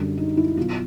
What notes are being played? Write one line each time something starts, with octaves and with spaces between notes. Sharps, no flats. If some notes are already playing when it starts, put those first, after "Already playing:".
Already playing: F#2 D3 G3
D#4
E4
B2 F#3 F4